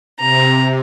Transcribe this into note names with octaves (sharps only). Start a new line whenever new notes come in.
C3 A#5